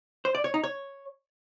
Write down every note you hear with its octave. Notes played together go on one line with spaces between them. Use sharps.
C5
D5
C#5
D#4
C#5